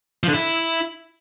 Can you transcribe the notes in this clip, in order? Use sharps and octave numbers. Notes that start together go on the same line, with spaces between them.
F3
D3
E4